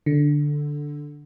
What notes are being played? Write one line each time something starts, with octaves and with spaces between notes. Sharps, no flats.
D3